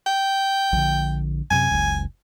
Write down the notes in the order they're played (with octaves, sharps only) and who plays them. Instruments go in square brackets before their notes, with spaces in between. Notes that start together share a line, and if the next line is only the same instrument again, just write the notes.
[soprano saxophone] G5
[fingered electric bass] A#1 D3
[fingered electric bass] F#2 A2 C3 [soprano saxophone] G#5
[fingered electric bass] F#1 C#2